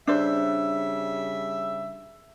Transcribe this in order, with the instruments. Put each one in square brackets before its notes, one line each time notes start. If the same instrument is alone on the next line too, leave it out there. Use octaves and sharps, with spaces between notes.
[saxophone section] C#3 G3 E5 [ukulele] D4 C5